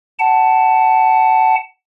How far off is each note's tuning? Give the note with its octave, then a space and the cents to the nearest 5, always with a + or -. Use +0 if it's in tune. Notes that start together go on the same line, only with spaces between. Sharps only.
F#5 +20 A5 +0